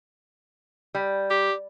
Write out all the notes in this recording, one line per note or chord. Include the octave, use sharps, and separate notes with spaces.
G3
G4